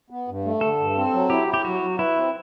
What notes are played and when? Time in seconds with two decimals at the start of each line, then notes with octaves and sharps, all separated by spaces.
0.10 B3
0.28 G2
0.45 A3
0.61 D3 A4
0.79 G2
0.96 C4
1.13 F#3
1.30 E4 G4
1.48 E4
1.54 G4
1.65 F#3 F#4
1.82 F#3
1.99 E4 B4
2.16 C4